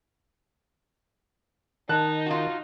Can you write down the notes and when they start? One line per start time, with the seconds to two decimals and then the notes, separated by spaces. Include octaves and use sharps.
1.89 D#3 D#4 A5 F#6
2.26 F4 F#4